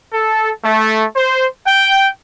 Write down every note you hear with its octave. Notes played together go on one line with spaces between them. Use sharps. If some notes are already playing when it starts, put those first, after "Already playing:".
A4
A3
C5
G5